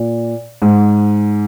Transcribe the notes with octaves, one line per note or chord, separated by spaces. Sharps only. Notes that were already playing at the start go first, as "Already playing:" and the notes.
Already playing: A#2
G#2